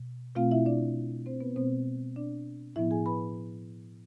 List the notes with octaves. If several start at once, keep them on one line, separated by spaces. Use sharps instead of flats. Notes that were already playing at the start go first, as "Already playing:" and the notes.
Already playing: B2
B2 A3 C4 F4 F5
E4 E5
D4 D5
C4 C5
B3 B4
B2 G#3 B3 C4 C5
D4 D5
A2 F3 B3 E4 E5
G#4 G#5
B4 B5